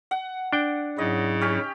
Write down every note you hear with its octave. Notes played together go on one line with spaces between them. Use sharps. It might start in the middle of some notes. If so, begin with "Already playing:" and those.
F#5
D4 G5
G#2 C#3 F#3 E4 D#5
C#4 G4